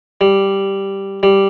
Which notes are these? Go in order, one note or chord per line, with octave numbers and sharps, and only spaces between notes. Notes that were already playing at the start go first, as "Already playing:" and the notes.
G3
G3